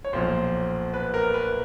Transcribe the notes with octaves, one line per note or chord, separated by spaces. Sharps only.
C#5
B1 A#2 F3 C5
B4
A#4
B4